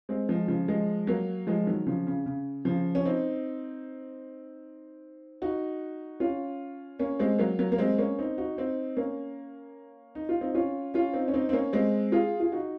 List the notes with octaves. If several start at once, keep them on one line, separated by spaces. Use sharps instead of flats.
G#3 C4
F3 G#3
C#3 F3
F3 G#3
F#3 A#3
F3 G#3
D#3 F#3
C#3 F3
C#3
C#3
C#3 F3
C#4
C4 D#4
D#4 F#4
C#4 F4
A#3 C#4
G#3 C4
F#3 A#3
F#3 A#3
A#3
G#3 C4
A#3 C#4
C4 D#4
D#4 F#4
C4 D#4
A#3 C#4
D#4
F4
C4 D#4
C#4 F4
C#4 F4
C4 D#4
C#4
C4 D#4
C4
A#3 C#4
G#3 C4
F4 G#4
F4
D#4 F#4